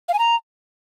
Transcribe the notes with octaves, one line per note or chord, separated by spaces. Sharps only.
F5
G#5
A#5